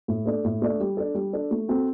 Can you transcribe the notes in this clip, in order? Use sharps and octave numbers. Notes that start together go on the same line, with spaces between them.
A2
A3 D4 A4 D5
A2
A3 D4 A4 D5
G3
D4 A4
G3
D4 A4
A3
C4 F#4 A4